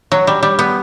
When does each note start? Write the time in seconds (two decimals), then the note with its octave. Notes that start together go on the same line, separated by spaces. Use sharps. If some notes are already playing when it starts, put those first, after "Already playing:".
0.12 F#3
0.27 G3
0.43 G3
0.59 B3